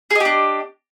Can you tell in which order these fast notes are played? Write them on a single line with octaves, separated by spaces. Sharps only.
G#4 D#5 G4 D4